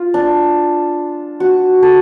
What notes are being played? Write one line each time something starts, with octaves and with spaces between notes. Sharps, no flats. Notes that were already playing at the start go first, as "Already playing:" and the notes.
Already playing: F4
D4
F#4
A4